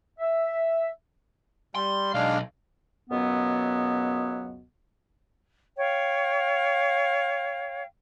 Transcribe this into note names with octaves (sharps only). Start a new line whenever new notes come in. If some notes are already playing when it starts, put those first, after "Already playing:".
E5
G3 C6
B1 G#3 D4 F5
C#2 F#2 B2 F#3 B3
C#5 F5 G5